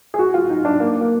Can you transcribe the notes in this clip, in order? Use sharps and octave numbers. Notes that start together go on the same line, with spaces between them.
G#4
F#4
F4
D#4
D4
A#3
A#3